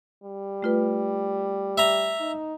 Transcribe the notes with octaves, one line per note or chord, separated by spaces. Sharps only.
G3
A3 F4 B4
E5 A#5
D#4